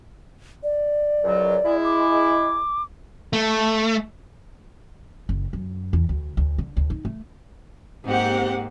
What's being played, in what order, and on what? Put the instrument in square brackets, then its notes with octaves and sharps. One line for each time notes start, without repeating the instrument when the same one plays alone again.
[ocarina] D5
[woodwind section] C#2 F#2 F#3
G#3 E4
[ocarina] D6
[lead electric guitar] A3
[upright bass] F#1
F#2
E2
D2
D2
D3
D2
D#4
A3
[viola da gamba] G#2 A#3 [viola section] C4 G4 F#5